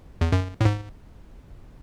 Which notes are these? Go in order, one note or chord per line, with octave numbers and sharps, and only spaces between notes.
E2
F#2
A2
G#2